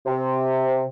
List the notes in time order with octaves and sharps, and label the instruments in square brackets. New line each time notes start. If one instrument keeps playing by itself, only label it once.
[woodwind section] C3